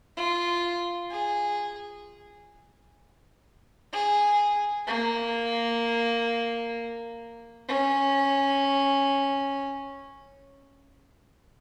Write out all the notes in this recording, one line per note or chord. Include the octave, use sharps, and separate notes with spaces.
F4
G#4
G#4
A#3
C#4